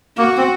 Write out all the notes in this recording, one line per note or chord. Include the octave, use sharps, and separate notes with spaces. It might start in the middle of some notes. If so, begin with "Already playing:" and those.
A#3 F#4
C4